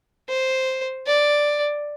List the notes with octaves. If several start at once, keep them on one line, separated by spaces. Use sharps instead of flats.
C5
D5